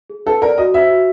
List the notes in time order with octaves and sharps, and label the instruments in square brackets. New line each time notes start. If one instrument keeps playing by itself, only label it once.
[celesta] G#4
[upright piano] A4 [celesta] B4
[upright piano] A#4 [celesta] D5
[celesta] F#4 [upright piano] D#5
[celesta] C5 [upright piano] E5
[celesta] F#4